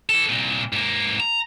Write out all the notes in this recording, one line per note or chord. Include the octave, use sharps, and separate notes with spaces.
E3 A4
C2 A#2
G#2 A#3
A#5